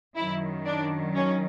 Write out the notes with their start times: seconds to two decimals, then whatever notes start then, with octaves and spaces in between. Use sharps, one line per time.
0.16 F#2 D#3 F#3 E4
0.65 D4
1.15 C#4